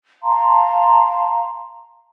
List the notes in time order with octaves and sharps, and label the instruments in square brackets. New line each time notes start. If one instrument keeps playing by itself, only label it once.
[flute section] F5 A5 A#5 C6